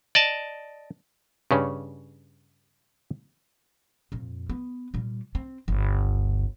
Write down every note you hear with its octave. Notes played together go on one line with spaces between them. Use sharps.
D5 D#5 A5
G2 C#3 C#4
F2 A#2
B3
A#2 G3
C4
G1 C#2